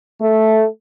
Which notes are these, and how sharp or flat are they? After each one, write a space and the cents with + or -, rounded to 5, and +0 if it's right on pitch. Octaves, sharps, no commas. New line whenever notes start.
A3 -5